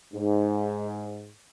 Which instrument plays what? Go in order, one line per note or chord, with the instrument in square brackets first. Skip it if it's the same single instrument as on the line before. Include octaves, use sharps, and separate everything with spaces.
[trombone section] G#2